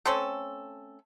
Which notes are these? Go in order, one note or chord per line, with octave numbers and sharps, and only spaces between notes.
A3 C4 C#4 A4